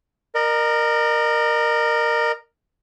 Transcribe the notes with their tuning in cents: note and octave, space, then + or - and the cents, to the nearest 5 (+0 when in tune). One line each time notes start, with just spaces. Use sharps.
A#4 +0 D#5 -45